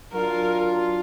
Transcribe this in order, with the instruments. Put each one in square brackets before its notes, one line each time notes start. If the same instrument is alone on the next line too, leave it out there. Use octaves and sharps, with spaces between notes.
[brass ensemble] F#3 D4 F4 [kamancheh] A#4